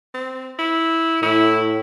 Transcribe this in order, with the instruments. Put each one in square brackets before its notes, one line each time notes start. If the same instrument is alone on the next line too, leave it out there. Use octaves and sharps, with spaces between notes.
[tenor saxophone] C4
E4
[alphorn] A2 [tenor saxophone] E4